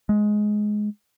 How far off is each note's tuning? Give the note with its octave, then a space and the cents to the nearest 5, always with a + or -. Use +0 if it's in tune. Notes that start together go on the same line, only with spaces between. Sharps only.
G#3 +15